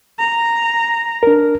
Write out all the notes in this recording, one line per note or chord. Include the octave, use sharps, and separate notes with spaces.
A#5
D4 A#4